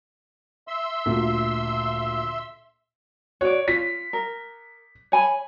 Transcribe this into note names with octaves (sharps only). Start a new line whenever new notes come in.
E5 C6 E6
D2 A#2
F#4 C#5 D5
F4 B6
A#4
C#5 G#5 B5